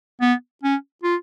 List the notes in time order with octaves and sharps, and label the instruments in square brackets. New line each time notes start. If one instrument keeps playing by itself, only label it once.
[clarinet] B3
C#4
F4